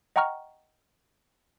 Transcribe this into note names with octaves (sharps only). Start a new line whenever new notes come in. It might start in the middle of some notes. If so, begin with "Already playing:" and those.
D#5 F#5 G5 A#5 C#6 F6